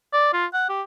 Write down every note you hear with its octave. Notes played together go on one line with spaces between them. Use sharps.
D5
F4
F#5
G4